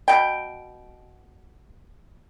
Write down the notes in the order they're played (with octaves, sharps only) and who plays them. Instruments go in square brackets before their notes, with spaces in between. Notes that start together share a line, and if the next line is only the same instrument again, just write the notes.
[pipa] B2 G5